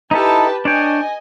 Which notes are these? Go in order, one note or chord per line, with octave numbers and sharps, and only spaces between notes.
D#4 E4 G4 A4 B4 A5
D4 C#5 D#5 G5 G#5